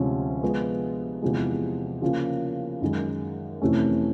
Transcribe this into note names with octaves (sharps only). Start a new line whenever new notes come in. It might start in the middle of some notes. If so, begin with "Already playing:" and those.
Already playing: D2 C3 F3 G#3 C#4
F3 G#3 B3
E2 C3 F3 G#3
C#3 F3 A#3 C#4 F4
F#2 D#3 G#3
F2 C3 E3 A3 C#4